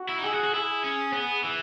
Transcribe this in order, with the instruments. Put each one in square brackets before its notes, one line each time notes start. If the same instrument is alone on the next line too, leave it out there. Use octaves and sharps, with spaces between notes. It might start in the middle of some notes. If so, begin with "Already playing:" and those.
Already playing: [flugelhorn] F#4
[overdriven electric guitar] E4
D#4
[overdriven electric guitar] E4 [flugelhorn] G#4
[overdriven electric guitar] F#4
F#4
[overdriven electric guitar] E4 [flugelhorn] G#4
[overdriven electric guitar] C#4
B3
E3